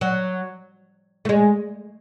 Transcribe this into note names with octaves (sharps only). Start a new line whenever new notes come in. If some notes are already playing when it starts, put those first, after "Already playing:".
F#3
A3
G#3